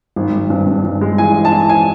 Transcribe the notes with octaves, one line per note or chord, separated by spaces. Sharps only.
G#1
G#1
G2
G2
G2
G#3
E3 G#5
E3
A5
E3
G#5